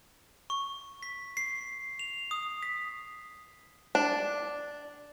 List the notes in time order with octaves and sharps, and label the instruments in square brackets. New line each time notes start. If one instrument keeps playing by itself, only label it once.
[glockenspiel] C#6
B6
C7
F7
D#6
B6
[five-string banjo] D4